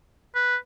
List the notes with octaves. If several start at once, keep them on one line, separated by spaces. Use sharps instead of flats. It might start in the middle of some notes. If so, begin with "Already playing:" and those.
B4